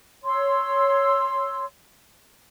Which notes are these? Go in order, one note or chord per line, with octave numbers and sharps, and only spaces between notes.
C#5 C6 E6